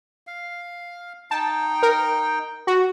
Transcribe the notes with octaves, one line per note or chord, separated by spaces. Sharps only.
F5
D#4 G5 A5
A#4
F#4